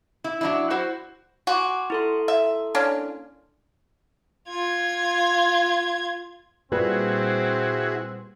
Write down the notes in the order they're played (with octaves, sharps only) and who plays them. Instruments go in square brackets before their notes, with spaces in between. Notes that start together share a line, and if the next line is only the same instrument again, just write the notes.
[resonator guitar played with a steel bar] E4
F#3 D4 E4
E4 F#4 C5
[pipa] F#4 [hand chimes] G#5 C6 D6
[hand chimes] E4 A4 C6
[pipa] E5
A#3 C#4 D4
[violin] F4 G#6
[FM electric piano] A#2 G3 [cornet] C4 [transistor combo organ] E4 F#4 G#4 [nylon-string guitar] B4